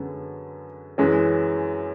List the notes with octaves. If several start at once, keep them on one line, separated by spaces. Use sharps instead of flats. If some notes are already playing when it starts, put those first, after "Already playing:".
Already playing: F#2 D3 G#3 B3
F#2 E3 G#3 C#4